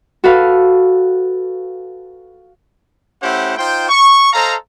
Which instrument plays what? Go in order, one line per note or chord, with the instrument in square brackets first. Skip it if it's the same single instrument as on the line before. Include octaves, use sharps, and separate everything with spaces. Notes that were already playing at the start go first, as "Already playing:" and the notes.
[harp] F#4 A4 B4 F5
[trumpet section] A3 C#4 E4 G4 C5 F#5
D#4 F4 C5 G5
C#6
A4 C5 D#5 F5 A#5